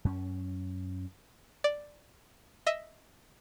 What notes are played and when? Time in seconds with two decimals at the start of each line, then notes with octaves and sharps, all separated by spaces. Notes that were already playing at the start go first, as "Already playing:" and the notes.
0.05 F#2 C#4
1.64 D5
2.66 D#5 E5